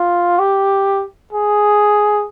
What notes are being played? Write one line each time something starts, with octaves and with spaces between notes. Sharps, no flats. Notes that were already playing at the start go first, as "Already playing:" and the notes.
Already playing: F4
G4
G#4